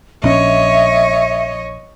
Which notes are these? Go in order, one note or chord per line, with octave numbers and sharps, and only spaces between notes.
A#1 C#4 C#5 D#5 E5